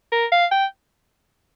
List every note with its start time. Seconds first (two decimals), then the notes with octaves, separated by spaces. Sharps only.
0.12 A#4
0.32 F5
0.51 G5